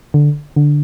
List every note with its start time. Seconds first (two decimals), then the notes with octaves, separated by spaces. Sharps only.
0.14 D3
0.56 D3